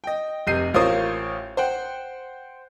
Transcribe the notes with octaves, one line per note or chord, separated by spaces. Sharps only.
D#5 G5
F1 C3 D#5 G6 C7 D#7
A1 F4 A#4 C5 C#5 D#6
C5 F#5 G5